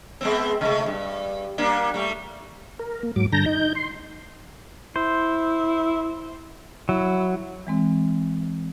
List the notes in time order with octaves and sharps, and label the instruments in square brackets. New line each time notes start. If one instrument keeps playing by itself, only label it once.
[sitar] G#3 B3 C4
C3 G#3 A3
G2
G3 A#3 D4
G3 A3
[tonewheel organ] A#4
A#3
G#2 F#3 D6
G2 D3 A5 A#5 G6 A#6
D#4 G6
C6
[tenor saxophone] E4 [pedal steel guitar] C5
[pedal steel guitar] F#3 [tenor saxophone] E4
[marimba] E3 G#3 C4